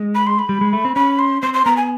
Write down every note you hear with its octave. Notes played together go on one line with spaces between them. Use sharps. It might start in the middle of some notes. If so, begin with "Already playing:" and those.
Already playing: G#3
B5
C6
B5
G3
G#3
A3
C4
C#4 B5
C6
C4 C6
C6
B3 A#5
G#5